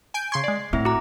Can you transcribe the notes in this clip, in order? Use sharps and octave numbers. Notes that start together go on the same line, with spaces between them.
G#5 G6 D7
C#3 C6 C#6 G#6 C7
G#3 D5
A2 C4 E4 E5
F#4 A#5 D6